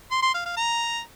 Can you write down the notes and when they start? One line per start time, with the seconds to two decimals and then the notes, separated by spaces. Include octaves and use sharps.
0.11 C6
0.23 C6
0.34 F5
0.46 F5
0.57 A#5